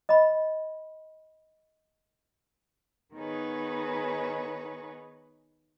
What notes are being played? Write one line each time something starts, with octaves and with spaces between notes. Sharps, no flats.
D#5 B5
D#3 B3 D#4 G#4 B4 C#5